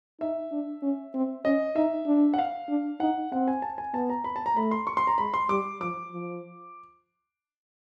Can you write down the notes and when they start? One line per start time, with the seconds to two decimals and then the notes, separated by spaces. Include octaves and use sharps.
0.21 D#4 E5
0.52 D4
0.82 C#4
1.14 C4
1.45 C#4 D#5
1.76 D#4 E5
2.07 D4
2.34 F#5
2.38 F5
2.69 D4
3.00 D#4 F#5
3.32 C4 F#5
3.48 G#5
3.62 A5
3.78 G#5
3.94 B3 A5
4.10 A#5
4.24 B5
4.36 A5
4.46 A#5
4.56 A3 B5
4.71 C6
4.87 C#6
4.97 C6
5.07 A#5
5.18 G#3 B5
5.34 C6
5.49 G3 D6
5.81 F3 D6
6.11 F3